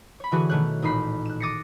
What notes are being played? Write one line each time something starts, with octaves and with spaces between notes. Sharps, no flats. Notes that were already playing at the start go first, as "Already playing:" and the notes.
C#5 B5
D3 E3 F#4 G#4
B2 D#3 A3 C#5 F#6
A1 A#2 D#4 B5 C7
F#6 E7
D6 D#6 A6 A#6 C7 C#7